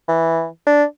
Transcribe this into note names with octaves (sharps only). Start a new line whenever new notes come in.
E3
D4